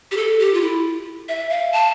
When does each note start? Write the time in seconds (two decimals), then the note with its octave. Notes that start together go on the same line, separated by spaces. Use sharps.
0.11 G4
0.17 A4
0.39 G4
0.54 F4
0.61 E4
1.28 E5
1.50 F5
1.72 A5